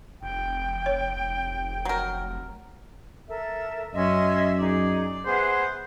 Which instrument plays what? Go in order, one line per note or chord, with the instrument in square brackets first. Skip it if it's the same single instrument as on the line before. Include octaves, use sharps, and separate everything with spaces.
[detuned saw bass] F1 [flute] G5
[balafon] C#5
[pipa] F#3 A#4
[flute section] A4 A#4 E5
[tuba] F#2 [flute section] C#4 D#5 C6 [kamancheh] E5
[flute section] D#4 G#4 [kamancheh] D5
[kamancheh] B3 F#5 [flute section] G#4 E5 [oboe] C5